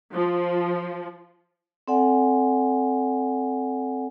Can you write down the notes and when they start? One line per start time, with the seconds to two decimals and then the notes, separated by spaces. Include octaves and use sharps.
0.12 F3
1.87 C4 A4 D5 F#5 G#5